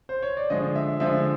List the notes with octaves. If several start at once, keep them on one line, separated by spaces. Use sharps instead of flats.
C5
C#5
D5
D3 F3 G#3 D#5
E5
D3 F3 G#3 E5